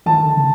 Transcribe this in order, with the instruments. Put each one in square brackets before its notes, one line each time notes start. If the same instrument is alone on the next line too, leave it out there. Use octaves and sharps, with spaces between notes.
[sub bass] D#3 [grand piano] A5
[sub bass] D3
C#3